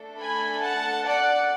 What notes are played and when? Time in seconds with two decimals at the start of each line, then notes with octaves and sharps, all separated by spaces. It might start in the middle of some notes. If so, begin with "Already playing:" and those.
Already playing: A3 D4 A4
0.20 G#5 B5
0.63 F#5 A5
1.06 D5 F#5